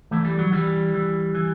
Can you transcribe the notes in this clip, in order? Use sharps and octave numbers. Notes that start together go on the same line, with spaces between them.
E3 A3
G3
F#3
E3 G3
E3
E3